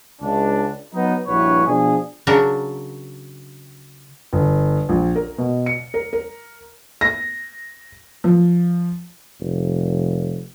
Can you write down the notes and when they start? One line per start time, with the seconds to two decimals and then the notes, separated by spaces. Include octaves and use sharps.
0.22 C#2 D4
0.94 F#3 B3 D#4
1.27 A#1 G2 E4 F#4 B4 C#5
1.66 B2 F3 D4 G#4
2.27 C#3 F#3 D4 A#4
4.33 G1
4.89 A#1
5.16 A#4
5.38 B2
5.66 C#7
5.94 A#4
6.13 A#4
7.01 A#6
8.24 F3
9.40 F1